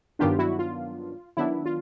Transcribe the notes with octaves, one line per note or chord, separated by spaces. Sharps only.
G2 D#3 F#3 B3 D4 F4 G4
E4 F#4
F4
D#3 F#3 B3 D4 E4
F4